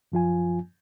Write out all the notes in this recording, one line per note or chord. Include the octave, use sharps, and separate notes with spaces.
F#2 F3 F4 G#5